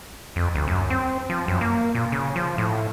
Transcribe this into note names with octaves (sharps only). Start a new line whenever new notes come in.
F2
D2
F#2
C4
F3
F#2
A#3
A#2
C#3
F3
A2